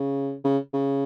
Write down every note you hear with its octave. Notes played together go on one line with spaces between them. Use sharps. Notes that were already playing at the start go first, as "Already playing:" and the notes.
Already playing: C#3
C#3
C#3